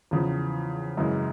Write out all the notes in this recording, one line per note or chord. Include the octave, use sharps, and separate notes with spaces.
E2 C#3 F3
F#2 C#3 E3 G#3